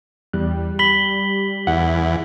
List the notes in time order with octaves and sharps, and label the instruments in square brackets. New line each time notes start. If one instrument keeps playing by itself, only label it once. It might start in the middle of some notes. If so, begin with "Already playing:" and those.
[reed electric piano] E2 F#6 [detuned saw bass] G3
[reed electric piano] B5 [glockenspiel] B6 F#7 G7
[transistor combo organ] E2 [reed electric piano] F#5